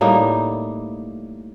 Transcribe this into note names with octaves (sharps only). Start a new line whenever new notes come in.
A2 G3 A#3 D#4